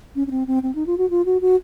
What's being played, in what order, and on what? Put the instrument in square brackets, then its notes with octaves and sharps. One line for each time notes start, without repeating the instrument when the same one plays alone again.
[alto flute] C#4
C#4
C4
C4
C4
D#4
F4
F#4
F4
F#4
F#4